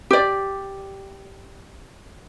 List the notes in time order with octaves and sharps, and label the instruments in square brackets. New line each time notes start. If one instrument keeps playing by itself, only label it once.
[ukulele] G4 D5